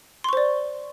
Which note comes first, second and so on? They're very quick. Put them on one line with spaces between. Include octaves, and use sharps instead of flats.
C6 C#6 C5 D5